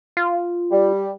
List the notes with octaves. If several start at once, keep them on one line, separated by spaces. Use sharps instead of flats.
F4
G3